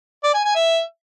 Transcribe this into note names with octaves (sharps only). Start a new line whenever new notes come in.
D5
G#5
G#5
E5